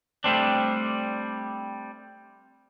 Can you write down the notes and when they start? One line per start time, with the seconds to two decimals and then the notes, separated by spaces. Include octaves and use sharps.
0.24 G3 A3 C4 D4